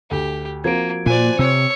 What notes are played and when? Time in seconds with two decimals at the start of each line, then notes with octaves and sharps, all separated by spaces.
0.11 D2 G4
0.64 F3 A#3 C4 F#4 G#6 D7
1.06 A#2 A#3 F4 C5 D5 G#5
1.39 C3 C#5 E6